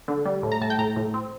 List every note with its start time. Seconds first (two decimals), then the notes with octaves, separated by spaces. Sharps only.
0.08 D3
0.25 G3
0.43 A2
0.52 A#5
0.61 A2 A5
0.70 G5
0.79 A2 A#5
0.96 A2
1.14 C4